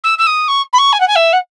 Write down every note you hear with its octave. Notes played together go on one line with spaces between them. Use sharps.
E6
E6
D#6
C#6
B5
C#6
G#5
F#5
G#5
E5
F#5